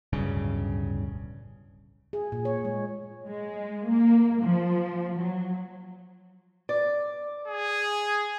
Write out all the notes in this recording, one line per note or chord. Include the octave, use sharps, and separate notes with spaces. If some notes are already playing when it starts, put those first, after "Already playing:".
D1 B1 G2 C#3
G#4
A#2
C#5
G#3
G#3
A#3
F3
F#3
D5
G#4